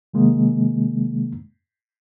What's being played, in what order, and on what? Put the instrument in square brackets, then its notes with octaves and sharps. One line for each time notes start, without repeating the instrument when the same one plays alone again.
[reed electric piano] C3 D#3 G#3 A#3